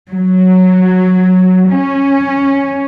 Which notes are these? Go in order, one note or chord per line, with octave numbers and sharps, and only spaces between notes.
F#3
C#4